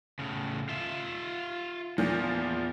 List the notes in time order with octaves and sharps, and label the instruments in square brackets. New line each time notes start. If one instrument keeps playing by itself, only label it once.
[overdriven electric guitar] A2 C#3
F4 E5
[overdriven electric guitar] E2 [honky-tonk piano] A#2 F3